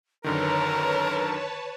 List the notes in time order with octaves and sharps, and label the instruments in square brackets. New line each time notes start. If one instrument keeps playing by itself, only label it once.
[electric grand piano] F#2 D3 D#3 [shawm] A#4 [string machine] B4 C#5 A5 [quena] A#5